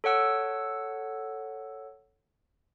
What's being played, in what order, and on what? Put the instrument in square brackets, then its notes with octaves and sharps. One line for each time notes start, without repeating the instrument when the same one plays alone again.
[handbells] A4 C#5 F#5 E6